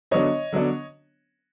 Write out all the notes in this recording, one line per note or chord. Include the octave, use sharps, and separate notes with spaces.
D3 F#3 B3 D4 C#5 D#5
D3 F#3 B3 D4